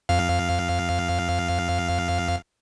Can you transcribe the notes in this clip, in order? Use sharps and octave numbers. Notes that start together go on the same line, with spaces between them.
F2 F5